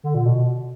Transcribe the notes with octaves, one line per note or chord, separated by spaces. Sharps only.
D3
A#2
B2